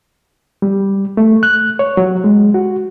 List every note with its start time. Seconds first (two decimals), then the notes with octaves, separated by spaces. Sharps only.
0.62 G3
1.17 A3
1.43 F#6
1.79 C#5
1.97 F#3
2.24 G#3
2.54 F#4